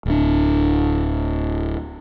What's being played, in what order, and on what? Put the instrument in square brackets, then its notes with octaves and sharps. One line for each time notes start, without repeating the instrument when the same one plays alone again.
[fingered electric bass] D1 D4